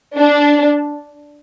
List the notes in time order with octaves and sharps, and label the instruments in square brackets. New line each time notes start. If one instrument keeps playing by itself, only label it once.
[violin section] D4